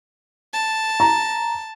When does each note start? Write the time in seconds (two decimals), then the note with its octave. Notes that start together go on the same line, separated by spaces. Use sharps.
0.53 A5
1.00 A#5